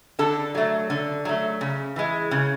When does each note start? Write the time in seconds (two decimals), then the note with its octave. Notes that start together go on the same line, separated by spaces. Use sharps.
0.19 D3 A4
0.55 F#3 A3
0.90 D3
1.25 F#3 A3
1.61 C#3
1.96 E3 G#3
2.31 C#3